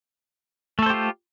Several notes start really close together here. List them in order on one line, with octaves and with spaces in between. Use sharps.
A3 A4 C5 G4 F4